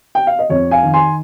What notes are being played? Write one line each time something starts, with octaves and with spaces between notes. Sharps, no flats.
G5
F5
D#5
F2 C#5
F5 G#5
D#3
G#5 C6